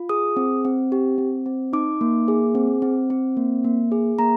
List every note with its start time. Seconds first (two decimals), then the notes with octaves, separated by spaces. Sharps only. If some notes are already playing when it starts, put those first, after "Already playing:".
Already playing: F4
0.09 G#4 D#6
0.37 C4
0.65 C4
0.92 G4
1.18 C4
1.46 C4
1.73 D#4 D6
2.01 A#3
2.28 G#4
2.55 C4
2.82 C4
3.10 C4
3.37 A#3
3.64 A#3
3.92 G#4
4.19 A#3 A#5